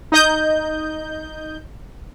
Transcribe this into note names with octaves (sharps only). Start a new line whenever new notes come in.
D#4 D#5 G6